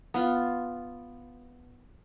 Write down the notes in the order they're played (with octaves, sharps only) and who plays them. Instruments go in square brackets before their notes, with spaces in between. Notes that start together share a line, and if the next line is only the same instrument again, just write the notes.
[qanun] B3 F4